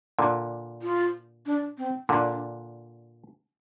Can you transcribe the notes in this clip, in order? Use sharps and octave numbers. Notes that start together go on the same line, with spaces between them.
A#2 D3
F4
D4
C4
A#2 D3 D4